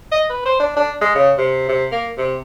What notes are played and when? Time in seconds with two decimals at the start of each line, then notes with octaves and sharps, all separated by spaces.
0.12 D#5
0.30 B4
0.45 C5
0.60 D4
0.77 D4
1.01 G#3
1.15 C#3
1.38 C3
1.69 C3
1.92 A#3
2.18 C3